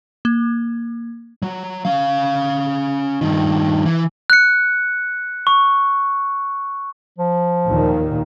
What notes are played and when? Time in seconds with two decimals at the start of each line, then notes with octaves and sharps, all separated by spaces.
0.25 A#3
1.42 F#3
1.85 C#4 F5
3.21 G2 D#3
3.85 E3
4.30 F#6 C#7
5.47 C#6
7.18 F3
7.67 D#2 A#2 D#3